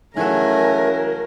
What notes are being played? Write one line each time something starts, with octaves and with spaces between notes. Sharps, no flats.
C#3 E3 F#3 A3 F#4 A#4 G#5